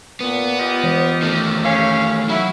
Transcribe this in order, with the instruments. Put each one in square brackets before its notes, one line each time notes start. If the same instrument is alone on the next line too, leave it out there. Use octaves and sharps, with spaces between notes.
[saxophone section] A#2 [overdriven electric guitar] B3
[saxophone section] F4 G4 D#5
[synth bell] E3
[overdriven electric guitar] D#3 A3
[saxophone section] C#4 G4 F5
[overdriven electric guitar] F#3 [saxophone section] E4